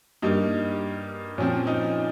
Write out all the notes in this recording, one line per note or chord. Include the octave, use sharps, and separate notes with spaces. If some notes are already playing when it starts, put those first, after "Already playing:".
G2 G3 A#3 D#4
A#2 F3 C4 C#4
D#4